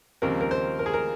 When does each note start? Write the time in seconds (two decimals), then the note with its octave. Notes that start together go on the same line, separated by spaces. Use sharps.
0.22 D#2 C#3 F3 C4 A#4
0.41 A#4
0.51 C5
0.79 A#4
0.86 G#4
0.93 A#4